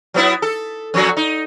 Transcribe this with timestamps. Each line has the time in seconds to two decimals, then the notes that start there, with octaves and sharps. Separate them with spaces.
0.14 F#3 B3 E4
0.42 A4
0.94 F2 F#3 F#4
1.17 D#4